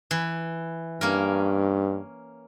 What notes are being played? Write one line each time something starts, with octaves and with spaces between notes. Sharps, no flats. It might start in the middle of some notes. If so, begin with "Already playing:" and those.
E3
G2 A#3 C#4 A#4